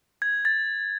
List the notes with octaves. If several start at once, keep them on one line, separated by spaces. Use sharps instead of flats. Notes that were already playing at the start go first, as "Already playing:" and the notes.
G#6
A6